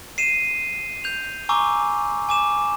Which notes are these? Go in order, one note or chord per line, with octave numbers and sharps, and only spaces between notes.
C7 D#7 E7
G6 F7
G#5 A#5 C#6 D6 E6
G#5 D6 E7